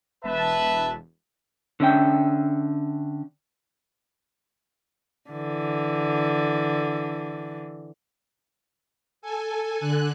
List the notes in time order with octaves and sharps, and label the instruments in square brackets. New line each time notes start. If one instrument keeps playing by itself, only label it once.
[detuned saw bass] E1 [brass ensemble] B4 E5 A5
[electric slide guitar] D3 C#4 E5 G5
[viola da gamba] D3 E3
[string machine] A4 G#5
D3 F#6